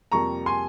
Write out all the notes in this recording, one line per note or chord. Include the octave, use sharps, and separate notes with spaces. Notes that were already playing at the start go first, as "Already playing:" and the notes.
F2 C3 G3 A#3 A#5 C#6
G#5 C6